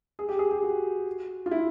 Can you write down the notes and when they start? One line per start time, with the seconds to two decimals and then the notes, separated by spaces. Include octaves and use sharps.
0.19 G#4
0.29 G4
0.39 G#4
0.51 G4
0.63 F#4
1.46 F4
1.51 E4